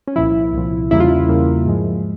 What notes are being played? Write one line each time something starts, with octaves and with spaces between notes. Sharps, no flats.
C#4
C2 A#2 F3 E4
C2 A#2 F3
E2 C#3 G3 A#3 E4
F4
E4
E2 C#3 G3 A#3
G#2 F3 G#3